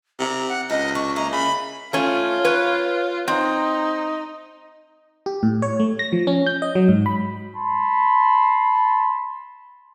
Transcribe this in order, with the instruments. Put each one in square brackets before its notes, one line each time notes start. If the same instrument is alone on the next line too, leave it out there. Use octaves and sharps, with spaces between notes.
[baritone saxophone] C3 [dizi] A#5
[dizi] F#5
[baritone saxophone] C#2 [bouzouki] D#4 [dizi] D#5
[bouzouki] D4 [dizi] C#6
[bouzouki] A#3 E4 D#5 [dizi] A#5
[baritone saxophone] C#3 [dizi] B5
[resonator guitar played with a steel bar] A3 C#4 [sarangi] F4
[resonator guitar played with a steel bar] B4 C#5
[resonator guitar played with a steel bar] C4 [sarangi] D#4
[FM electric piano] G4
A2
C#5
A3
A#6
F3
C#4
G6
D#5
F#3
G#2
B5
[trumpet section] A5 B5 C6